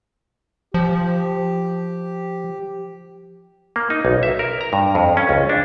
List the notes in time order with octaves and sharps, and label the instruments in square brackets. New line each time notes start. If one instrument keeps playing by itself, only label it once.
[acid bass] F3 [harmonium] G4
[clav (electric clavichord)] A#3
D#4
B1
E5
A#4
A#5
G2
F2
C#4
C#2
D4